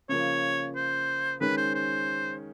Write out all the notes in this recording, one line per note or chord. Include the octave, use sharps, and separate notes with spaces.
C#3 F3 A#3 C#5
C5
D#3 G#3 C#4 B4
C5
C5